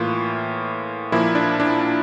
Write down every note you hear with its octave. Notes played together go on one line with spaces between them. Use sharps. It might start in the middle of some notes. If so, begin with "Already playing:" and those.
Already playing: A2 E3 A#3 F4
A#2 F3 A#3 E4
D4
D4